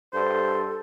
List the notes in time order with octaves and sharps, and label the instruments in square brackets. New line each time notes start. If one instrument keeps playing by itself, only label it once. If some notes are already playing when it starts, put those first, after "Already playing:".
[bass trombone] G2 [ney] A4 [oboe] C5